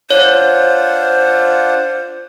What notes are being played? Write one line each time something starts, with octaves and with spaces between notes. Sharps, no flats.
D4 F4 C5 C#5 F#5